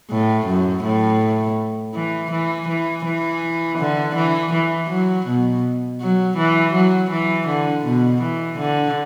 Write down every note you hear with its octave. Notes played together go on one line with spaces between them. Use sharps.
A2
F#2
A2
E3
E3
E3
E3
D3
E3
E3
F#3
B2
F#3
E3
F#3
E3
D3
B2
E3
D3